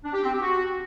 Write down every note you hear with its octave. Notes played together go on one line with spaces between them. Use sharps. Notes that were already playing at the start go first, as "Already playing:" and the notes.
D4
G4
C4
G4
F#4